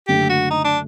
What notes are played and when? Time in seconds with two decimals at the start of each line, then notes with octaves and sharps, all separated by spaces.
0.08 F#1 F#2 D3 A3 G4
0.29 F#4
0.50 D#4
0.64 D4